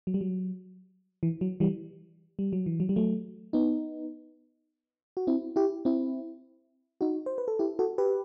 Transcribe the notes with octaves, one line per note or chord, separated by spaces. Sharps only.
F#3
G3
F#3
E3
F#3
E3 G3
G3
F#3
E3
F#3
G3
F#3 A3
B3 D#4
F#4
C4 E4
E4 G4
C4 E4
D#4 F#4
C5
B4
A4
E4 G4
F#4 A4
G4 B4